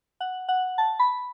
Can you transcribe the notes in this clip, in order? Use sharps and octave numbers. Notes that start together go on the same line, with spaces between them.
F#5
F#5
A5
B5